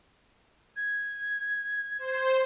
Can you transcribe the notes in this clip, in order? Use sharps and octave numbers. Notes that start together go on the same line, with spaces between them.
G#6
C5